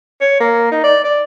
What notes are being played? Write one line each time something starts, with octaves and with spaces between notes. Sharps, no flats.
C#5
A#3
D#4
D5
D5